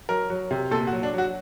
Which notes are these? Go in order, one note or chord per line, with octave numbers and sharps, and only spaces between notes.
F#3 A#4
F#3
C3
A#2 A4
F#4
F#3
D4
F#3 F#4